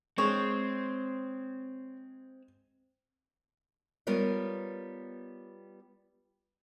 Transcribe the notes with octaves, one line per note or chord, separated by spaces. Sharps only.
G#3 C4 C#5
G3 B3 F4 A#4 B4 C#5